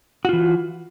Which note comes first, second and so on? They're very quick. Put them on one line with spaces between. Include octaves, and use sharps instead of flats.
F#4 F4 E3